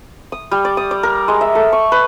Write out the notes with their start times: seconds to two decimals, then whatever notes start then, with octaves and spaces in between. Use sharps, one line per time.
0.32 D#6
0.51 G3
0.65 D5
0.77 D#6
0.91 D5
1.03 A#4
1.28 G#3
1.41 E5
1.55 A4
1.73 C#6
1.92 B4